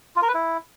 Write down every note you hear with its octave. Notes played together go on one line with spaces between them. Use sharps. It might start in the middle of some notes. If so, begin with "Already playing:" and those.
F4
A#4
B4
E4